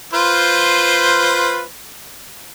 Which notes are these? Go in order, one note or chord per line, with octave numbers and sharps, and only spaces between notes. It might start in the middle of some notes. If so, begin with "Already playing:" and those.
F4 B4 C5